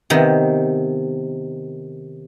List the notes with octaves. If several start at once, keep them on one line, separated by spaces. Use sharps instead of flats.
C3 D#3 B3